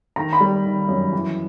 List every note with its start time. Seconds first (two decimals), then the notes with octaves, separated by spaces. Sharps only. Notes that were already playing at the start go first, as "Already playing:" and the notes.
0.16 D#3 A#5
0.33 B5
0.40 G3
0.64 D#3
0.89 F#2
1.12 E3